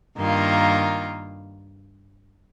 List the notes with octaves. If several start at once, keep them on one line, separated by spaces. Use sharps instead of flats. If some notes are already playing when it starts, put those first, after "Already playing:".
G2 D#3 A#3 F4